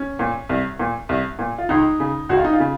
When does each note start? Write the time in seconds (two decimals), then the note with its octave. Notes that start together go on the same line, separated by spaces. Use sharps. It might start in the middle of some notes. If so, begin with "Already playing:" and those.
Already playing: C#4
0.19 A#2
0.49 C2
0.79 A#2
1.09 C2
1.39 A#2
1.58 F4
1.69 C#2 D#4
2.00 C#3
2.29 C#2 F#4
2.37 F4
2.44 D#4
2.53 F4
2.60 C#3